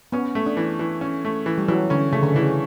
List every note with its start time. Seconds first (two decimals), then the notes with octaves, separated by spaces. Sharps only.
0.12 B3 C#4
0.35 A3
0.46 D4
0.57 E3
0.79 E3
1.01 C#4
1.25 A3
1.46 E3
1.58 G3
1.68 E3 F#3
1.90 D3 C#4
2.13 C#3 A3
2.23 D3
2.34 C#3 E3